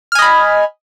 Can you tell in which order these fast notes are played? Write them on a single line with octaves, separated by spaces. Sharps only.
F6 G#5 D#5 B5